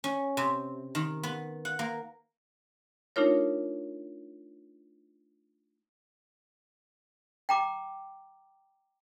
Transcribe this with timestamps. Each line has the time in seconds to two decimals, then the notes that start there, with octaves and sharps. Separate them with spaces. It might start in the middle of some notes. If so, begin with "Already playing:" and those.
0.04 C#4
0.37 C3
0.95 D#3
1.23 B3
1.65 F#5
1.79 A#3
3.16 A3 D4 D#4 F4 A#4 C#5
7.49 G5 A#5 D6